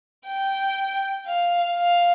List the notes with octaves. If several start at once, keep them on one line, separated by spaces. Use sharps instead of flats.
G5
F5
F5